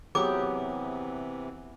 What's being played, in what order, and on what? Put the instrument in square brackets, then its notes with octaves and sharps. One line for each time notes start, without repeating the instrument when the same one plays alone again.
[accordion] C3 E3 [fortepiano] F#3 [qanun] B3 G4 [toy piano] G#4 D6